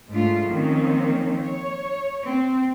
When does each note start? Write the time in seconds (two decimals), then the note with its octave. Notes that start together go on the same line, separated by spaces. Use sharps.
0.10 G#2 A3 D4 F4
0.48 D#3 F3 A#3 C4 C#4
1.43 C#5
2.26 C4